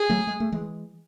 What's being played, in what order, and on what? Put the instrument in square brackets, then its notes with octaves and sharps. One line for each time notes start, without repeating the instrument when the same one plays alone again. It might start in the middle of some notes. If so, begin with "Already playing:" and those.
Already playing: [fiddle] G#4
[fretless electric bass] F#3 A3
G#3
A3
E3 G#3